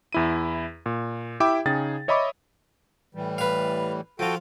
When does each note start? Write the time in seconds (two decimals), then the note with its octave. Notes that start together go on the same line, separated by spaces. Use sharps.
0.13 E2 E4 D#7
0.86 A#2
1.40 E4 G4 E5 G5 D6
1.66 C#3 D#4 G#4 G5 A6
2.08 C#5 D#5 E5 B5 C#6 D6
3.15 A2 E3 G3
3.38 B4 F5
4.19 F3 F4 F#4 A4 G5